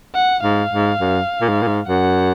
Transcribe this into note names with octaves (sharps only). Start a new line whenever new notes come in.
F#5
G#2 F5
G#2
F#2
A#2
G#2
A#2
G#2
F#2 F#5